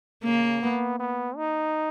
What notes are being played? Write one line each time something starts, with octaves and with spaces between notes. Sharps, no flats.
C#3 A#3
B3
B3
D#4